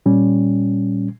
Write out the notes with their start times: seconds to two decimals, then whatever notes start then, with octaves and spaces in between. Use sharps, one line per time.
0.06 A#2 G3 C#4